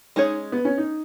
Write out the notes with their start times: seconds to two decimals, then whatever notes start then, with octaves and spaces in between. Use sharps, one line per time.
0.16 G#3 C#4 D#4 G#4 C#5
0.52 B3
0.65 C#4
0.78 D#4